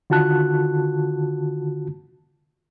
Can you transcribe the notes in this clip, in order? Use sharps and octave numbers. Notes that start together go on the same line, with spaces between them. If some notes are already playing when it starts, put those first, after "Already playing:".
D3 D#3 F4 F#4 A5 F#6